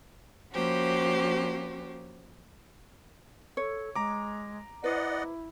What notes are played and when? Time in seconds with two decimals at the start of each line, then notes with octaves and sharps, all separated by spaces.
0.53 F3 A#3 C#4 F#4 G4 C5
3.57 A4 C#5
3.96 G#3 A#5 D6
4.84 E4 B4 C5 D5 D#5 F#5